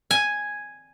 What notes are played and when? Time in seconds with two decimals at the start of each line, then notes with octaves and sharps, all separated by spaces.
0.11 G#5